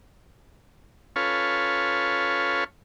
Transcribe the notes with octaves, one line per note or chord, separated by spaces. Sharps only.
C#4 F4 A4 B4 C#5 F5